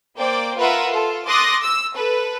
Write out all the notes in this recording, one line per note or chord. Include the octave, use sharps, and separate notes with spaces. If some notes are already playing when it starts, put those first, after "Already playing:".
A#3 C5 D5 G5
F4 A#4 B4 E5 F#5 B5
F4 A4
C6 D6 D#6 F#6 A6 A#6
E6
A4 B4